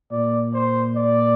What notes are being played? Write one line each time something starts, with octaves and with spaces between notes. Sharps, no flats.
A#2 D5
C5
D5